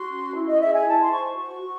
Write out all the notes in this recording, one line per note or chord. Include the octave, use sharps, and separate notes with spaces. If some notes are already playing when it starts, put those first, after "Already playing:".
Already playing: F#4 C6
C#4
E4
D#5
G#4 E5
G#5
E4 A5
C6
C5 C#6
F#4 C#6
F#4